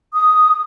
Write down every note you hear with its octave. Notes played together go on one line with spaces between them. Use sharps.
D#6